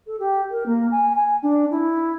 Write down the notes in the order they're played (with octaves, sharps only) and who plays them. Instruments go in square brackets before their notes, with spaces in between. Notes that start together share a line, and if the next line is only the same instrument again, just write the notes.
[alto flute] A4
G4
A#4
A#3
G#5
G#5
D4
E4